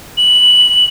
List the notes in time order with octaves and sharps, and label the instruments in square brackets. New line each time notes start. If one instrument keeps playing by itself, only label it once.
[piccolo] F#7